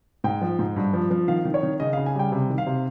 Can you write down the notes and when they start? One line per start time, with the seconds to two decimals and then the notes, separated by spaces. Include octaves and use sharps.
0.24 G#2 G5
0.41 F3
0.59 G#2
0.76 G2
0.93 F3
1.11 F3
1.28 D#3 F5
1.45 D#3
1.54 C#5
1.63 D#3
1.80 C#3 D#5
1.93 F5
1.97 C#3
2.06 G#5
2.15 G3 G5
2.32 C3
2.50 D#3
2.58 F5
2.67 C3